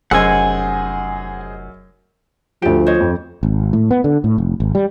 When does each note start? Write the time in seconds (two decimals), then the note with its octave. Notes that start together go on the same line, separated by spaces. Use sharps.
0.11 F1 F#2 G#4 C5 D#5 F#5 G#5 E6
2.62 D2 F3 G4 A4 D7
2.87 C5 C#5 D#5
3.00 F2
3.43 G#1
3.73 A2
3.91 B3
4.04 D3
4.24 A2
4.38 F1
4.60 G#1
4.75 G3